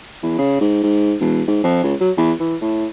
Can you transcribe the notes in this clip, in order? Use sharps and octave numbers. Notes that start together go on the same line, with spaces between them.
E2
C#3
G#2
G#2
E1
G#2
F2
C#2
F#3
E2
E3
A2